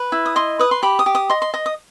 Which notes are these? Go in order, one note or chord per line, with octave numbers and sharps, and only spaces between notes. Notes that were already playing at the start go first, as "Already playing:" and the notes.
Already playing: B4
E4
D#6
D#5 C6
B4 D#6
C6
G4 B5
D#6
G4
D#6
D#5 C6
C6
D#5
D#6